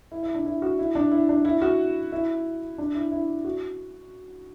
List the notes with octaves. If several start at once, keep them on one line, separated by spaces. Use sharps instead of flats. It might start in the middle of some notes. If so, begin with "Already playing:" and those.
E4
E4
D4
E4
F#4
E4
D4
E4
D4
E4
F#4
E4
D4
E4
E4
F#4